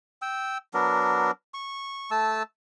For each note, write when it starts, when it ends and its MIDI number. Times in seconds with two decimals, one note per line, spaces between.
0.22 0.58 79
0.22 0.58 88
0.74 1.31 54
0.74 1.31 59
0.74 1.31 62
0.74 1.31 70
1.54 2.10 85
2.11 2.43 57
2.11 2.43 81
2.11 2.43 88